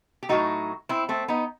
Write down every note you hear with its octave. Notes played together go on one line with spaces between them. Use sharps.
G4
A2 F#3 A3 D#4 F#4
C4 E4
A3 C4
B3 D#4